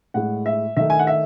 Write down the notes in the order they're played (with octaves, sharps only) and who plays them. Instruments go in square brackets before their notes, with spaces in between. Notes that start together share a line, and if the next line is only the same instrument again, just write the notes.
[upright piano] A2 G#3 F#5
E5
D#3 A3 E5
G#5
F#5
E5